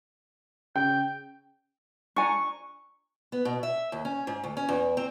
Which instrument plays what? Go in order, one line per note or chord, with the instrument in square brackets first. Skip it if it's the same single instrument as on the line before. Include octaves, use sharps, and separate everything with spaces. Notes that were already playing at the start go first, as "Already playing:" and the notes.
[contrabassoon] C#3 [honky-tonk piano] G5 [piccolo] G6
[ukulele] D4 G#5 A#5 [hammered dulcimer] C#6
[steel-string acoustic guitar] B3
B2
E5
D#2
C#4
G#2
D2
C#4
E2
C4